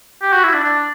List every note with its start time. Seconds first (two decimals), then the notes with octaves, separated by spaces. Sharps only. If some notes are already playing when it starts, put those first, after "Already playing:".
0.22 G4
0.33 F#4
0.44 E4
0.54 D4
0.64 D4